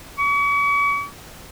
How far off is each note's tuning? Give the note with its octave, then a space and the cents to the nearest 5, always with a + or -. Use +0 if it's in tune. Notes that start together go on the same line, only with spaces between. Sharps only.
C#6 +40